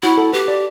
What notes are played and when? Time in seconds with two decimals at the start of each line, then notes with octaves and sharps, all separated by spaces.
0.03 E4 F#4
0.17 A4
0.33 G4 B4
0.48 D5